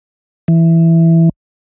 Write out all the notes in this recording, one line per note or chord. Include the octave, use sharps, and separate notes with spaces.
E3